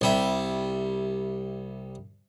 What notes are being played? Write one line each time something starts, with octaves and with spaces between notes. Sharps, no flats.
C2 G3 E5